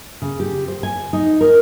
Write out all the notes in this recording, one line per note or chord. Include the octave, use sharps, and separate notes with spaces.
C#3
G4
C5
G#5
D#4
A#4